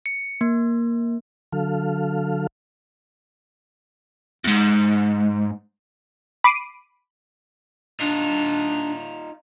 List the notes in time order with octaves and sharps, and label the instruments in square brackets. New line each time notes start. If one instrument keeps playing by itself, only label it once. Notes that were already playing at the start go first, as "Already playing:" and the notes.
[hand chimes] C#7
A#3
[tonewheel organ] D3 F#3 A4 F5
[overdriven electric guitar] E2 G#2
[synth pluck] B5 D6 C7 D7 D#7
[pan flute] D4 [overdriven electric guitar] D#4 F4